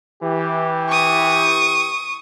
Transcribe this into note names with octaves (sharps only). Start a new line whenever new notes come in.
E3 G4
C#6 D#6